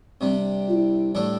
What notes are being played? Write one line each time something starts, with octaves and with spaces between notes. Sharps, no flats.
C3 G3 C4 D4
F4
E4
A2 G3 D4 A4